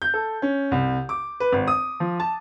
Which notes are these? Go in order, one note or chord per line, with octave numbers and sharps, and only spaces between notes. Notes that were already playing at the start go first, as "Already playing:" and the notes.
G6
A4
C#4
C2
D6
B4
G#1
D#6
F3
A5